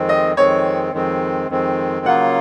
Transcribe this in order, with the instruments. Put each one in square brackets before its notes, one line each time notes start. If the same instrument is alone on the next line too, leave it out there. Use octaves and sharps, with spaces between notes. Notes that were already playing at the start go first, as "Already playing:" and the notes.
Already playing: [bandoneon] F2 D#3 G#3 C4
[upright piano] D#5
[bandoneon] F2 D#3 G#3 C4 [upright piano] C#5
[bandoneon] F2 D#3 G#3 C4
F2 D#3 G#3 C4
[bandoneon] C#3 F#3 A#3 F4 [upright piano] F#5